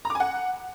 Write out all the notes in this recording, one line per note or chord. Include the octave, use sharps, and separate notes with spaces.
A#5
D6
G#5
F#5